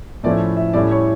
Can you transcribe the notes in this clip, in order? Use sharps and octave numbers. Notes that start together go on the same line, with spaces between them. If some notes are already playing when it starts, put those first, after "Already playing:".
A2 F3 A3 C#4 E4 D5
E5
A2 G3 C#4 E4 D5
C#5